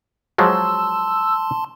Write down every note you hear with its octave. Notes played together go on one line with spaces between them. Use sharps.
F3 F#3 G#3 A5 C6 E6